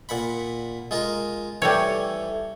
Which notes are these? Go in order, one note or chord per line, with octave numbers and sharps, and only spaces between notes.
A#2 F#5 B5
G#3 F4 A#4
E3 G3 A3 C#5